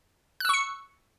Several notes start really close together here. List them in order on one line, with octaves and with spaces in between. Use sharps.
F#6 E6 C#6 C#7